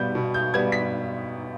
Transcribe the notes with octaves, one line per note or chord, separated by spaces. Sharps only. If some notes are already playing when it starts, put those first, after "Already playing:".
Already playing: B2 G3 B3 G6
B2
G6
G3 B3 G#6
B6